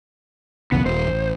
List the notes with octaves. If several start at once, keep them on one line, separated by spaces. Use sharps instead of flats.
B1 E2 C#3 B3
D#1 C5
A1